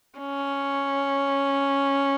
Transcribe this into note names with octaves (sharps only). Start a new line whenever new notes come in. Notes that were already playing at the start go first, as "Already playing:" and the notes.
C#4